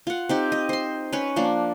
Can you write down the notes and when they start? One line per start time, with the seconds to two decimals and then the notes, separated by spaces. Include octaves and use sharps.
0.07 F4 F#5
0.29 C4 D#4 G4
0.52 D#5
0.69 C5 C6
1.13 C#4 B4 C#5
1.36 F3 A#3 D4